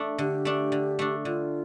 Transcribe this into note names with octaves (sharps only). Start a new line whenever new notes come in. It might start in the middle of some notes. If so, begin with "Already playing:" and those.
Already playing: A3 D4
D3 G4
A3 D4
D3
A3 D4
D3 F4